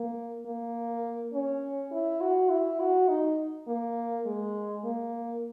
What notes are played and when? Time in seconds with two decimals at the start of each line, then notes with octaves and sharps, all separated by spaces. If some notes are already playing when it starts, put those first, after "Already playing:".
Already playing: A#3
0.46 A#3
1.33 C#4
1.92 E4
2.21 F#4
2.50 E4
2.80 F#4
3.09 D#4
3.68 A#3
4.26 G#3
4.85 A#3